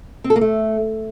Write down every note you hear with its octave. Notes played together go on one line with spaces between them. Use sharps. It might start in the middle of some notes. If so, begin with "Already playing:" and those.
C4
A4
A#3
A3